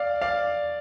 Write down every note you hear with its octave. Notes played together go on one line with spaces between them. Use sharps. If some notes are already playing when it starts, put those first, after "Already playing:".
Already playing: D5 F5
D5 F5